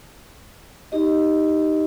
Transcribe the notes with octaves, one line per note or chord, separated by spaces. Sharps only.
D#4 G4 D#5